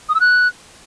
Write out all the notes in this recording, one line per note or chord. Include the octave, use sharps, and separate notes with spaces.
D#6
E6
F#6